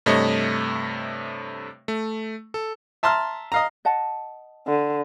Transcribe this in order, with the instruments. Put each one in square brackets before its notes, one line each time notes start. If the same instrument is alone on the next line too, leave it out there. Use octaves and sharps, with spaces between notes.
[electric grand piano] G2 C3 A3 C#5 D#5
A3
A4
[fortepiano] E5 A5 A#5 C6 F6
D#5 F5 A#5
[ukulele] D#5 F#5 A5
[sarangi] D3